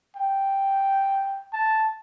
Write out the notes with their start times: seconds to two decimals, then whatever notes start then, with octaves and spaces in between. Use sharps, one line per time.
0.16 G5
1.53 A5